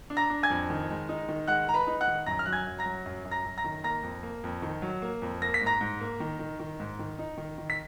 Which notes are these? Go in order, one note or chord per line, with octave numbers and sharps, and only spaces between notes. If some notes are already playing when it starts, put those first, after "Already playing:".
D4
A#5 A#6
D4
G#5 G#6
F2
D#3
G#3
D#4
D#3
G#3 F#5 F#6
G#3 A#5
B4 B5
D#4
F#5 F#6
D#3
F#2 A#5 A#6
F6
F#3 F#6
G#5 G#6
F#2
A#5 A#6
F#3
F#2
F#2
A#5 A#6
F#2
A#5 A#6
D#3
A#3 A#5 A#6
F2
A#3
F2
D#3
F#3
A#3
F2
A#3 A#6
B6
G#2
A#5 A#6
G#2
A#3
D#3
D#3
D#3
G#2
D#3
D#4
D#3
D#3
B6